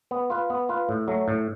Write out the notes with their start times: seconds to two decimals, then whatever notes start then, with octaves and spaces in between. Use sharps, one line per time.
0.11 B3
0.30 F4 B4
0.50 B3
0.69 F4 B4
0.89 A2
1.08 F#3 A3
1.28 A2